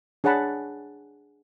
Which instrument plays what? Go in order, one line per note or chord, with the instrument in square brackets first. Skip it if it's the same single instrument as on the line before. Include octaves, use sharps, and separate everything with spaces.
[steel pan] D4 G#4 C#5 F#5 A5 B5